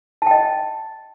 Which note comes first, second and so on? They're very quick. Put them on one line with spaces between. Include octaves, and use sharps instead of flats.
A5 G5 D#5